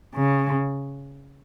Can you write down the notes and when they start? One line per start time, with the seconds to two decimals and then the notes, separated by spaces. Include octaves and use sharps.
0.15 C#3